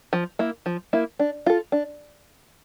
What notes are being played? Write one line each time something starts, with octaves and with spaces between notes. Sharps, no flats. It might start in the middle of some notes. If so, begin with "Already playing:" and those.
F3
A#3 E4
F3
A#3 E4
D4
F4 A4
D4